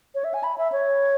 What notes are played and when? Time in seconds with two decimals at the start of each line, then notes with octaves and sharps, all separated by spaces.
0.15 C#5
0.24 E5
0.34 G#5
0.43 B5
0.58 E5
0.72 C#5